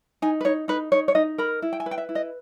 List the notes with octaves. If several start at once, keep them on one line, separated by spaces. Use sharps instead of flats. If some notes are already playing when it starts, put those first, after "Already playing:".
D#4 G#5
B4
D#4 C#5
D#4 B4
D#4 C#5
C#5
D#4 D#5
A#4 B5
E4
G5
G#5
B4
G5
E5
E4
D#5